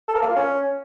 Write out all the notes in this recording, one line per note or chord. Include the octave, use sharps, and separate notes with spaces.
A4
A#4
A#3
F4
C#4